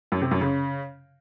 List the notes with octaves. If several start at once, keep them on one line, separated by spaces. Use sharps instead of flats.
F#2
C3
F#2
C#3